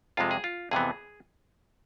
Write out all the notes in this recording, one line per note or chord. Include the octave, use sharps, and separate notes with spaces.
F2 C3 G#3 F4
G#4
F4
F2 C3 E3 B3 G#4